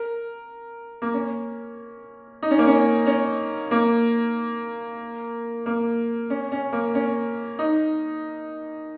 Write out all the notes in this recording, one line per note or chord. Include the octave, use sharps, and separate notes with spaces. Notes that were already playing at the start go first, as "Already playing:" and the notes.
Already playing: A#4
A#3
C#4
D#4
C#4
A#3
C#4
C#4
A#3
A#3
C#4
C#4
A#3
C#4
D#4